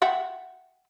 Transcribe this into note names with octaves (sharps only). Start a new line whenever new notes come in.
E5 F#5 G5